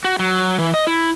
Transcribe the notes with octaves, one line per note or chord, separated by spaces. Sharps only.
F#4
F#3
E3
D#5
E4